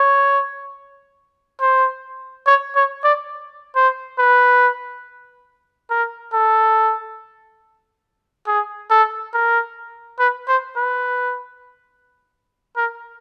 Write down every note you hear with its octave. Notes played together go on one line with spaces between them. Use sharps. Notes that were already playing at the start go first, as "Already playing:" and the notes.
Already playing: C#5
C5
C#5
C#5
D5
C5
B4
A#4
A4
G#4
A4
A#4
B4
C5
B4
A#4